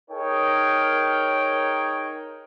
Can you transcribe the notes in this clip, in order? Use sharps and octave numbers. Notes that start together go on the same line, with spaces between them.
D#4 G#4 A#4 C#5 G5